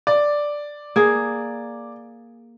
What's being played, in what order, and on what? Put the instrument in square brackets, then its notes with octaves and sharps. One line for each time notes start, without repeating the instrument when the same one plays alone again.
[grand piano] D5
[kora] A#3 G#4